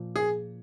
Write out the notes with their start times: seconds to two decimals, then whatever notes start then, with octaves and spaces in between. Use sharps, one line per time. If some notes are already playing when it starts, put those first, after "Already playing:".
Already playing: A#2 F3
0.16 G#4